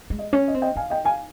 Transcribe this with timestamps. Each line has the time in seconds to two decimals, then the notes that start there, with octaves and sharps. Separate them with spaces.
0.10 G#3
0.19 D#5
0.33 C#4 C#5
0.48 D#5
0.54 C4
0.62 D#5 G5
0.76 D#4 F5 G#5
0.90 D#5 G5
1.05 F5 G#5